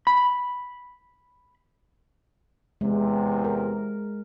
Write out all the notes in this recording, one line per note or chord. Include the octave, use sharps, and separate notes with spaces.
B5
E2 C3 G#3
A#4